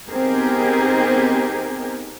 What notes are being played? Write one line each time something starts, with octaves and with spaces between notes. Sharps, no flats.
B3 C4 D#4 G4 G#4 A#4